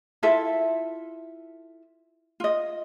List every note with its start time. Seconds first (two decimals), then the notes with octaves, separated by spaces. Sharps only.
0.23 E4 F4 A4 E5
2.40 F4 D#5